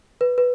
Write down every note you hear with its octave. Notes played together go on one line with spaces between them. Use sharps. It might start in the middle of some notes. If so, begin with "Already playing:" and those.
B4
B4